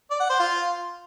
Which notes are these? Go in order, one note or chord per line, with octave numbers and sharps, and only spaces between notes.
D5
F#5
C5
F4